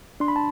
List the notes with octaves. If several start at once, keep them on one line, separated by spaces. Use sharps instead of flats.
D4 C6
B5
A5